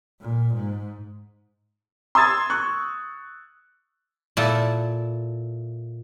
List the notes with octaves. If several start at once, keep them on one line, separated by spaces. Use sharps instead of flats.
A#2
G#2
C6 D#6 E6 G#6 A6
C#6 F#6
A#2 E4 A4